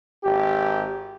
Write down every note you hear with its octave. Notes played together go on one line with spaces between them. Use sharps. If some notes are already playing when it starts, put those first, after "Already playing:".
G#1 G4